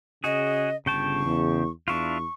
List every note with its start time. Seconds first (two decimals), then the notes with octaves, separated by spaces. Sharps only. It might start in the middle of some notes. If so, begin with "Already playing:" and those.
0.24 C#3 F#4 G#4 D#5
0.86 G1 C#3 G5 A5 C#6
1.25 E2
1.88 E2 D4 E4 F4 C#6